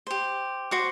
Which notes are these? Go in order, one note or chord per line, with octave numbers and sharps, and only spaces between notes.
G4 C5
F#4 C5 D6